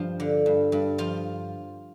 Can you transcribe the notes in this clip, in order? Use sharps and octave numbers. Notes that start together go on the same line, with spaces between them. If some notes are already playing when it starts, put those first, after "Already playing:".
Already playing: G2 F3
D3
G2
G2
F3 F4